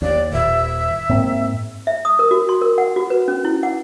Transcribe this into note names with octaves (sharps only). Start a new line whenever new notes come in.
D#2 D5
D#1 E5
G#2 A#3 C4
E5
D#6
A#4
F#4
C6
A#4
F#5
F#4
B4
C#4
E4
F#5